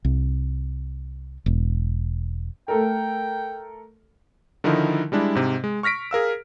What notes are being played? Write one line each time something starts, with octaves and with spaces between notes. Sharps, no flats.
C2
E1
A3 A4 A#4 G5
D3 D#3 F3 D#4 E4 A#4
G3 G#3 D4 E4
G#2 C3
G#3
C#6 F6 A#6 B6 D7
G#4 A#4 F5 E6